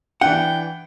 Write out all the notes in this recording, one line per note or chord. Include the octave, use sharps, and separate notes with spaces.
E3 D4 F#5 G5